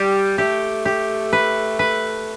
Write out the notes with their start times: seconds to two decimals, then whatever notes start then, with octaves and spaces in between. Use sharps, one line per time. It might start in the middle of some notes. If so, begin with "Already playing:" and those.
Already playing: G3 G4
0.38 A3 G4
0.85 G4
1.33 B4
1.79 B4